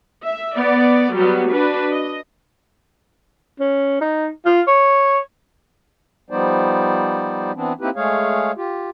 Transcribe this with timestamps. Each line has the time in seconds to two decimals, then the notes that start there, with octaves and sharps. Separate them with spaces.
0.23 E5
0.56 B3 D5
1.13 F#3 G3 B3
1.52 D4 F#4 B4
1.91 D#5
3.60 C#4
4.01 D#4
4.46 F4
4.68 C#5
6.30 F3 G3 B3 D#4 C5 D5
7.56 E3 B3 C4 D4
7.81 A#3 C4 D#4 E4 G4 B4
7.96 G#3 A3 G#4 C#5 F5
8.57 F4 G4